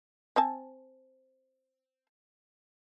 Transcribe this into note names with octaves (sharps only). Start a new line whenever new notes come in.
C4 G#5 A5